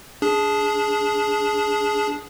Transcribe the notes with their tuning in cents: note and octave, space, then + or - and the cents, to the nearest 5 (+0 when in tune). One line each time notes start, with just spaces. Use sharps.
D4 -20 G#4 +0